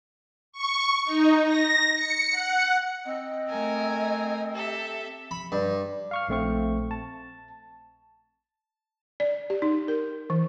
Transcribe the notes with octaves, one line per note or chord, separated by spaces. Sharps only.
C#6
D#4
A#6
C#7
F#5
C4 D#5
A3 A#4 G#5
G4 A4 E5
B5
G2
F5 C#6 F6
A#1 A3 C4 C#6
A5
D5
G4
D#4
A#4
E3